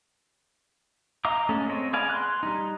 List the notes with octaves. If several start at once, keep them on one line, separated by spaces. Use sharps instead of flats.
D#5 F5 A#5 D6 D#6
G#3 A3 C#4 A4
C4 C#5 D#5
B3 G#4 D5 F5 G#5
C6 F#6
G3 D#4